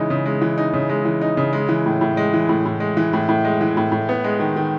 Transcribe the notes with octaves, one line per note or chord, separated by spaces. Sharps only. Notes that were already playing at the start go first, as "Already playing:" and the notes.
Already playing: C#3 E3 G#3 D#4
C#3
G#3
E3
D#4
C#3
G#3
E3
D#4
C#3
G#3
E3
A2
A2
G#3
E3
A2
A2
G#3
E3
A2
A2
G#3
E3
A2
A2
B3
G#3
D#3
D#3